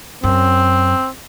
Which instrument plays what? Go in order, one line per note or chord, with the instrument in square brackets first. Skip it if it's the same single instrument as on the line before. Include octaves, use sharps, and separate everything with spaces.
[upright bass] F#2 [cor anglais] C4